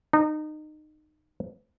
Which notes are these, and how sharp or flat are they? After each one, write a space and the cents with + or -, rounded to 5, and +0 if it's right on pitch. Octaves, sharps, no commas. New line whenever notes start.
D#4 -25